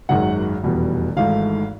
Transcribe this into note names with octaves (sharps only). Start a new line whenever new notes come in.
G#1 F#2 D#3 G#3 F#5
F1 E2 B2 G3
G#1 G#2 E3 A3 F5